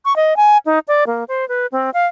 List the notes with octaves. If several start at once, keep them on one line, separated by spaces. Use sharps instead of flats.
C#6
D#5
G#5
D#4
D5
A#3
C5
B4
C4
F5